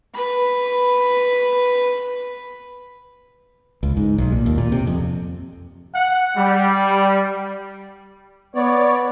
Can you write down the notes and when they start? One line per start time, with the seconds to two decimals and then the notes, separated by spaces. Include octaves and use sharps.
0.14 B4 B5
3.83 C#2
3.97 G#2
4.18 B1
4.32 A#2
4.46 D#2
4.58 A#2
4.72 C3
4.87 F2
5.94 F#5
6.37 G3
8.55 B3 C#5 D5